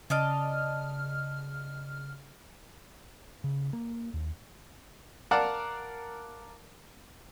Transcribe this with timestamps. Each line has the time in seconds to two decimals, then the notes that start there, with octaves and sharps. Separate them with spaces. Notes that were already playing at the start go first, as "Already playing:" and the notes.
0.10 C#3 D5 D#5 A5 F6
3.44 C#3
3.73 A#3
4.14 D#2
5.31 A#4 D5 F5 F#5 A5